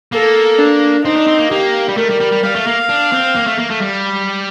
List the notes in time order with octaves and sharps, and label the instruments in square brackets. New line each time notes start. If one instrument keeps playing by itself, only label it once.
[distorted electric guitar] A#3 [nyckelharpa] A4
[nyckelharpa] D4
[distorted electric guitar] C4 [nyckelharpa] D#4
[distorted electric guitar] D4
C4
A#3
[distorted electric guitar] A#3 [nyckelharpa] G4
[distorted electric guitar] G3
[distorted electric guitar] A3 [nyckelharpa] A#4
[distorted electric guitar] G3
G3
G3
[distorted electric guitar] G3 [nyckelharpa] F5
[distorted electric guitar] A3
A#3
D4
C4
A#3
A3
A#3
A3
G3